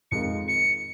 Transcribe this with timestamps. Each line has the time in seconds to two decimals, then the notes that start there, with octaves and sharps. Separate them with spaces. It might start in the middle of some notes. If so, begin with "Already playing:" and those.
0.11 F2 D#3 G#3 D#4 C#7
0.48 C#7